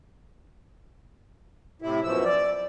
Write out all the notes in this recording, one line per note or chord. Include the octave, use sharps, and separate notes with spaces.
A2 C3 E4
F#2 B2 F3 E6
D5